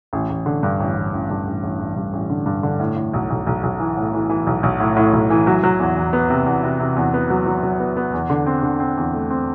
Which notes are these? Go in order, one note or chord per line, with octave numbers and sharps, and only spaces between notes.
A1
A1
D3
G2
A1
A1
A1
G2
A1
A1
A1
G2
A1
D3
G2
D3
A2
A2
B1
B1
B1
B1
E3
A2
E3
E3
B1
B1
A2
A2
B1
E3
F#3
F#3
E2
E2
B3
C3
E2
C3
C3
E2
B3
F#3
F#3
F#3
B3
B3
E2
D3
C4
D3
C4
E2
A3
C4